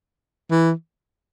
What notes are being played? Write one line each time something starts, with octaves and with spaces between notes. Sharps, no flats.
E3